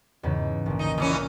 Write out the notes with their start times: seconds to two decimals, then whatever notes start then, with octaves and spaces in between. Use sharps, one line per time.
0.23 E2 G#2 C#3
0.66 A#1 D3
0.79 D#4
0.98 A#2 E3 C#4
1.11 F6